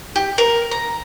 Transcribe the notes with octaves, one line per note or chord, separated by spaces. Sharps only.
G4
A#4
A#5